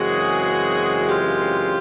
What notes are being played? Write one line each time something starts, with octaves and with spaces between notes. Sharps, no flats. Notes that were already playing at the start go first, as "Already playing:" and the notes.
Already playing: F#2 C#3 E3 G#3 C4 F#4 G#4
F4 G4